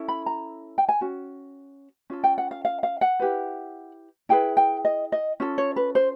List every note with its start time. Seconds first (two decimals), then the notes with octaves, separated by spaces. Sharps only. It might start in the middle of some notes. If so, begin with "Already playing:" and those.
Already playing: C#4 E4 A4
0.08 B5
0.26 A#5
0.78 G5
0.89 G#5
1.01 C#4 F#4
2.10 C#4 F4 A4
2.24 G5
2.38 F#5
2.51 F5
2.65 F5
2.83 F5
3.01 F#5
3.20 E4 G4 B4
4.29 E4 G#4 B4 G5
4.57 G5
4.85 D#5
5.12 D#5
5.40 C#4 F4 A4
5.58 C#5
5.76 B4
5.95 C5